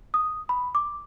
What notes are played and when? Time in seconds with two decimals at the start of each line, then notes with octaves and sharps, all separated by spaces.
0.14 D#6
0.49 B5
0.75 D6